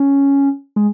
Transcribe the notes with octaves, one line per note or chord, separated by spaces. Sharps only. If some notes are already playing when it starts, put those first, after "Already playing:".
Already playing: C#4
G#3